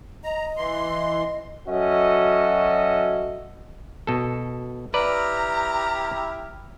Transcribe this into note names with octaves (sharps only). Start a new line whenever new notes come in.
D#5 A#5
E3 C6
F#3 C#4 F#4 A4 D#5 E5
B2 A4
E4 G4 B4 D5 A#5 F6